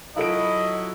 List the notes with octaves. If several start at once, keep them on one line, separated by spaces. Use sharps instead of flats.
F#3 E4 F4 A4 D#5 D7